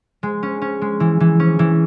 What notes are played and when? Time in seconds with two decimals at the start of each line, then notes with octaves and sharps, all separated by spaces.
0.23 G#3
0.43 C#4
0.62 C#4
0.82 G#3
1.00 E3
1.20 E3
1.40 C#4
1.59 E3